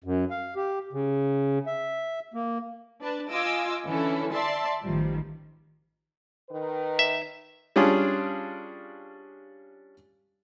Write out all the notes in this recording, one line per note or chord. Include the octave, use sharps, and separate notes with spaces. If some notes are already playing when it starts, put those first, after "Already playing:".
F#2
F5
G4
C#3
E5
A#3
D4 B4 A5
F4 D#5 G#5 D6 E6
D3 E3 C#4 E4 A4
D5 E5 A5 C6
A1 D#3 F3 G3
D#3 B4
E5
G3 C#4 D4 F4 G#4